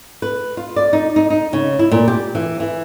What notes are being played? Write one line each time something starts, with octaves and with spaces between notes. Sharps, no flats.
B4
F4
D5
D#4
D#4
D#4
C#3
E4
A#2
G4
E3
E3